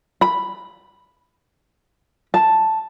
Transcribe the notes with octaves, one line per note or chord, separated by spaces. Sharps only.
B5
A5